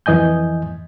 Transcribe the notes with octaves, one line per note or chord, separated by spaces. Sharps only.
F2 E3 D#5 G#5 G6